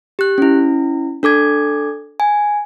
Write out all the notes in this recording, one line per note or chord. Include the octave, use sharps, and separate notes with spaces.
G4 F#6
C#4 E4
D4 A4 D6 G#6
G#5